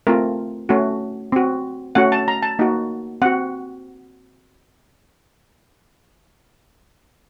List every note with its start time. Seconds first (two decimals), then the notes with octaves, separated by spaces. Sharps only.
0.07 A3 C4 F4 A#4
0.69 A3 C#4 F#4
1.32 C4 F#4
1.95 A3 C#4 F#4 F#5
2.12 A5
2.28 A#5
2.43 A5
2.59 A#3 D#4 F#4
3.22 C4 F#4 F#5